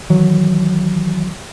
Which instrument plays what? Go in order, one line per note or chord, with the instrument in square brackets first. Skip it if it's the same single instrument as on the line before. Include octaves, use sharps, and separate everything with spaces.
[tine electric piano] D#3 E3 F#3